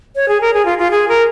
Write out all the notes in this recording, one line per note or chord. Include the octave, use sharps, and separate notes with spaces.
C#5
G#4
A#4
G#4
F4
F4
G#4
A#4